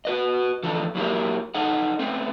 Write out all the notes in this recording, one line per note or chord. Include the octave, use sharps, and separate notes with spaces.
F#4 B4 D#5
D3 E3 F3 A4
F#3 A#3 E4 F4 G4 A#4
D#4 A4 D#5 F#5
A3 B3 C4